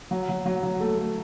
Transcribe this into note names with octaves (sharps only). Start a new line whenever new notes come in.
F#3
F#3
F#3
F#3
A3
A3